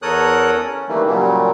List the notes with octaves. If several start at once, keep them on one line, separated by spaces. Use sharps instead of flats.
E2 A4 A#4 C#5 D#6 F#6
C#4
D#3 E3 G3 A3 A#3
A#2 C#3 F#3 G3